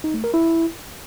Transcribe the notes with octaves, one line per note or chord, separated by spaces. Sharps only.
D#4
A3
A#4
E4